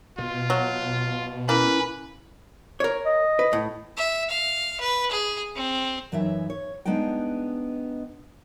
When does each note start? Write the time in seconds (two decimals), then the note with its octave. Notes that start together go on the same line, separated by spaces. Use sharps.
0.19 B2 F4
0.50 F#3
1.49 A#3 C#4 E4 B4 B5
2.80 A#4 C#5
3.06 D#5
3.39 B4
3.53 A2
3.97 E5
4.30 F5
4.80 B4
5.11 G#4
5.55 C4
6.12 F#2 E3 D#4 C#5 E5
6.50 C#5
6.85 G#3 B3 D4 D#4 G5